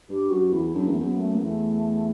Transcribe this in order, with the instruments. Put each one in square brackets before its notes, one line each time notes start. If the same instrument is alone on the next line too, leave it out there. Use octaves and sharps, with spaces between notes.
[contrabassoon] G2 [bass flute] G4
[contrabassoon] F#2 [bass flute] F#4
[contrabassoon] E2 [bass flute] E4
[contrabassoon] F#2 [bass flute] D4
[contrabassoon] E2 [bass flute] A3
[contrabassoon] F#2 [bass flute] B3
[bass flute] A3
B3
[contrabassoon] E2 [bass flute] A3